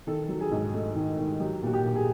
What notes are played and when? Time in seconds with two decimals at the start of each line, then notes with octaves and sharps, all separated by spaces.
0.07 D#3 A4
0.29 F#3
0.40 G#4
0.51 G#2
0.74 A3
0.95 D#3
1.18 D#3
1.40 F#3 G4
1.63 A#2 F#4
1.73 G4
1.85 A#2
1.95 G#4